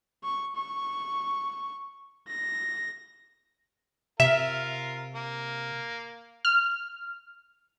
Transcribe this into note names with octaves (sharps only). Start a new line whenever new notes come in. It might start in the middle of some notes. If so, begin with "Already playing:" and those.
C#6
C#6
A#6
C3 F4 A#4 E5 F5 E7
A#3
F6